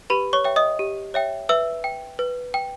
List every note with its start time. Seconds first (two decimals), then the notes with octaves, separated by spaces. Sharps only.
0.10 G4 B4 B5
0.33 C#5 C#6
0.45 C#5 E5 G5
0.56 D#5 D#6
0.79 G4
1.14 C#5 E5 G5
1.49 B4 E5 E6
1.84 G5
2.19 B4
2.54 G5